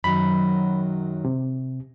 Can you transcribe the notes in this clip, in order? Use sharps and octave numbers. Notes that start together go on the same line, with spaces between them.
F#2 D#3 F#3 B5
C3